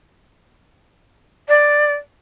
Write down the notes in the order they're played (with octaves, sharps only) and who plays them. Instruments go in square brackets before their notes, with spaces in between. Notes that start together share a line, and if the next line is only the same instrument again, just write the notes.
[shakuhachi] D5